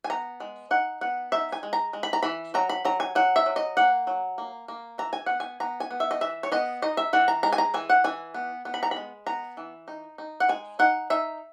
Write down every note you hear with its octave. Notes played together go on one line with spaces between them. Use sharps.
G#5
B3 A#5
G#3
D#4 F#5
B3 F#5
D#4 E5
G#5
G#3
A#5
G#3
B5
A#5
E3 B5
F#3 A#5
B5
F#3 A#5
G#5
F#3 F#5
E5
F#3
D#5
A#3 F#5
F#3
A#3
A#3
E3 A#5
G#5
B3 F#5
G#5
B3 A#5
G#5
B3
E5
D#5
E3 E5
C#5
B3 D#5
D#4 D#5
E5
E3 F#5
A#5
G#3 A#5
G#5
A#5
E3 G#5
F#5
E3 G#5
B3
B3
B5
A#5
B5
G#3
B3 A#5
E3
D#4
D#4
F#5
G#3 G#5
D#4 F#5
D#4 E5